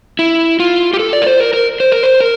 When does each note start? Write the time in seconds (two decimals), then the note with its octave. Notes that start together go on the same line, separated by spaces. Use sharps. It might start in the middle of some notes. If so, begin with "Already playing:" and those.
0.19 E4
0.60 F4
0.94 G4
0.99 A4
1.13 D5
1.22 A#4
1.27 C5
1.40 A#4
1.54 A#4
1.80 C5
1.92 A#4
2.03 C5
2.21 A#4